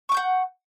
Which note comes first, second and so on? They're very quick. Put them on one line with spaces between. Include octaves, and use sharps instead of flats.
C#6 D6 G6 F#5